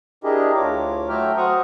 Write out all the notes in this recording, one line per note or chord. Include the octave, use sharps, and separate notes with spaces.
D4 E4 G4 G#4 A#4 D#5
D2 E4 F4 C#5 D6
F#3 A3 E5 G5 A#5 F6
F#4 C5 F#5 A#5 C#6 D#6